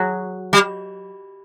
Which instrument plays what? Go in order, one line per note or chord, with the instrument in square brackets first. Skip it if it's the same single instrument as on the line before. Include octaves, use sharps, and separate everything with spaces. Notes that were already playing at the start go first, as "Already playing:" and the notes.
Already playing: [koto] F#3 F#4 G#4
[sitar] G3